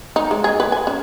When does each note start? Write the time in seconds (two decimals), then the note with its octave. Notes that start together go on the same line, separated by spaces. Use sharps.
0.16 D#4
0.31 G#3
0.44 G#4
0.60 B4
0.72 G#5
0.87 C#4